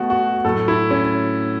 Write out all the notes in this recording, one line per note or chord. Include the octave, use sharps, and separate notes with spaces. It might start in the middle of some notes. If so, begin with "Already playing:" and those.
Already playing: B2 A3 F#4
F#4
A2 F#3 A3 A4
E4
C#4